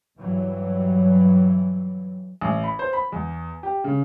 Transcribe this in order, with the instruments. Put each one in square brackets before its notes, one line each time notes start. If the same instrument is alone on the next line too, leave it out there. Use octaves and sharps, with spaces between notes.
[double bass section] G2 E3 F#3
[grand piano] A1
B5
C5
B5
E2
G4
C#3